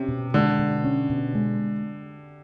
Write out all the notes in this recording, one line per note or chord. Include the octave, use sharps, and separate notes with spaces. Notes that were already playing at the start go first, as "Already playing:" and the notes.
Already playing: C3 C#4
B2
D3 G#3
B2
C#4
B2
G#3